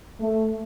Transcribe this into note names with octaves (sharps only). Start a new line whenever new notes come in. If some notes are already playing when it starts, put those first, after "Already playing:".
A3